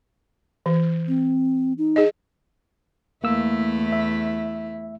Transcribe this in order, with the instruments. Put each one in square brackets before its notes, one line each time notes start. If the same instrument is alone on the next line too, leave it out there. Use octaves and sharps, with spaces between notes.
[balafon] E3
[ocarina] C4
D#4
[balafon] G#4 D#5
[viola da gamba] E2 A3 E4 [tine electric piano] A#3 E6
[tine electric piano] E5